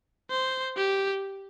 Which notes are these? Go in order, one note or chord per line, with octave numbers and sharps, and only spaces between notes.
C5
G4